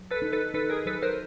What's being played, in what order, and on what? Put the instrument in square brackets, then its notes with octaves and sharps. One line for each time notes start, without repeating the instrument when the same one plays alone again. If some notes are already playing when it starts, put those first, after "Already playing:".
Already playing: [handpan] F#3
[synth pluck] A4 B4
[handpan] D#4
[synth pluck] A4 B4
[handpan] D#4 [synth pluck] A4 B4
[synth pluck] G#4 A#4
[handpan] F#3 [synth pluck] A4 B4
[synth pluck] A#4 C5